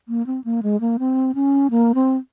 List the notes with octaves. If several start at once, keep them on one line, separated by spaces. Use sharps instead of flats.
A#3
C4
A#3
G#3
A#3
C4
C#4
A#3
C4